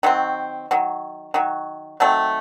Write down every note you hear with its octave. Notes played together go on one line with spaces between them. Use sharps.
D#3 F#3 C4
D#3 F#3
D#3 F#3
D#3 F#3 A3 C4